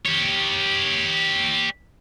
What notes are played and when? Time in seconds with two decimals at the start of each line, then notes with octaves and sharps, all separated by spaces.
0.05 G4 C#5